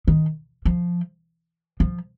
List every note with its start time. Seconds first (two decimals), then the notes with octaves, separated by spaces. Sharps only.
0.08 D#3
0.65 F3
1.80 F3